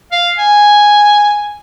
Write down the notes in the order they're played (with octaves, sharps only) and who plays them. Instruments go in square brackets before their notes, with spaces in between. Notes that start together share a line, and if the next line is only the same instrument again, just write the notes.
[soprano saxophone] F5
G#5